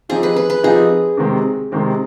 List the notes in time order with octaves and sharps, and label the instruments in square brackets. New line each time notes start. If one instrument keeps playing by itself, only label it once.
[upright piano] F3 C4 D#4 G4 [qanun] G#4
[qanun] B4
B4
B4
[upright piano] F3 C4 D#4 G4 [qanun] G#4
[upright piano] C3 D#3 G#3 C4 G4
C3 D#3 G#3 C4 G4